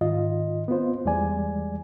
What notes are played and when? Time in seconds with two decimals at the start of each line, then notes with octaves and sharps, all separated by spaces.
0.01 G#2 D#3 F4 D#5
0.68 B3 C4 F4 C5
1.05 E2 E3 G3 G#3 D5 G#5